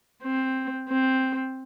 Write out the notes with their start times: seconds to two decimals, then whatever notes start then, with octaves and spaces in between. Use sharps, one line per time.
0.23 C4
0.90 C4